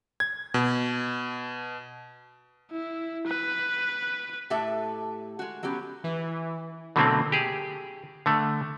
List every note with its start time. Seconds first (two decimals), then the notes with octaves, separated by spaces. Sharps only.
0.20 G#6
0.54 B2
2.71 E4
3.27 B4
4.50 A2 A3 G4 A4 E5
5.39 G#3 F#4
5.63 F#3 B3 C#4 G4
6.04 E3
6.96 B2 D3 F#3 A3 A#3 C4
7.32 G4 G#4
8.26 D3 A3